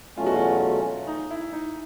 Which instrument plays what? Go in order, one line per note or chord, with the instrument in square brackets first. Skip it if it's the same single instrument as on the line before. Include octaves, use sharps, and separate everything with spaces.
[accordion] E2 B2 F#3 A3 C#4 [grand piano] F4
[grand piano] F#4
F4
D#4
E4
D#4